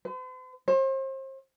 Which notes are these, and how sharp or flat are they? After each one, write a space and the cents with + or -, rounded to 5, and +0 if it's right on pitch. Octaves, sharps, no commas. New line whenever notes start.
C5 -45
C5 +35